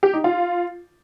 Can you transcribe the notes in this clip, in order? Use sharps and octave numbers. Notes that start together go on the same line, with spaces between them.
G4
D#4
F4